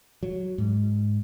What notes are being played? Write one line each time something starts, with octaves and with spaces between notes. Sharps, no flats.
F#3
G#2